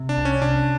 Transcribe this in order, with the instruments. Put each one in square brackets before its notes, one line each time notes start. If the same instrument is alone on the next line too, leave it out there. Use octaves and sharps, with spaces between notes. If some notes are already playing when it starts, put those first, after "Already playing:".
Already playing: [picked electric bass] C3
[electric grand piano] D4
[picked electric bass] C2
[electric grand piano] C#4
[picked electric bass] C3 [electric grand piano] D4